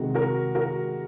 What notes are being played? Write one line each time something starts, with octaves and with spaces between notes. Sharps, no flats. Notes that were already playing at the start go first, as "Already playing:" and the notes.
Already playing: C3 D#3 G#3 D#4 F#4
F#4 A#4
F#4 A#4